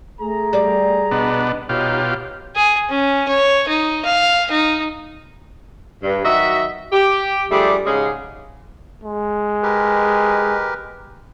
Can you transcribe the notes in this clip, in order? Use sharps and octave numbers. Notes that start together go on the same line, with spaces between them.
A3 G#4 A#5
G3 D5
B2 B3 D4 D#5
B2 D#4 F4 G4 C#5
G#4
C#4
C#5
D#4
F5
D#4
G2
D#3 F#3 F#4 D#5 E5
G4
F3 G3 A3 D4 G4 G#4
G#2 C#3 G#3 C#4 G#4
G#3
G4 A#4 B4